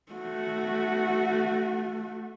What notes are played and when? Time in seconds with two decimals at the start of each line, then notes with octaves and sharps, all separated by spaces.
0.12 A3 F#4